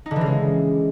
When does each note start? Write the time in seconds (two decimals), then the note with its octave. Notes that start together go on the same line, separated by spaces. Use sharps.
0.06 D#4
0.11 D3
0.16 E3
0.21 C#3
0.26 G#3